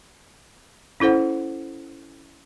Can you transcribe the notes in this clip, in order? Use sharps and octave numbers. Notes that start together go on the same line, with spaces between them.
C#4 E4 A4 C5 F#5